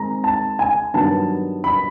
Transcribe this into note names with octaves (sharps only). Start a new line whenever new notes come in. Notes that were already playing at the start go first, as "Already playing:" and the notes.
Already playing: D#3 G#3 C4 A#5
A5
G#5
G2 D#3 F#3 B3 A5
B5